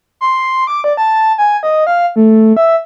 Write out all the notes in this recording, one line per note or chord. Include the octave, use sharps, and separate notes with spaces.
C6
D6
D5
A5
G#5
D#5
F5
A3
E5